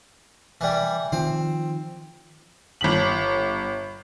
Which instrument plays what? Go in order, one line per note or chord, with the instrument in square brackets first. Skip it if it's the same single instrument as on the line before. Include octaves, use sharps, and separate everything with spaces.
[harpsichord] E3 G3
[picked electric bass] D#3 F3 [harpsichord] C4
[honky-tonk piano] G1 B6 F#7